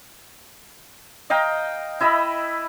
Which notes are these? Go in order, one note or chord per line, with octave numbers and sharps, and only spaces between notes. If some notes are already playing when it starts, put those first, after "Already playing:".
D#5 F5 G5 A#5
E4 D#5 E5 B5